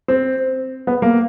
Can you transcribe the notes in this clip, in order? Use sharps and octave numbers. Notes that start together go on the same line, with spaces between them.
C4
B3
A#3